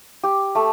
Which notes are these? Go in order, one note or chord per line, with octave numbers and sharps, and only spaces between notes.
G4
A3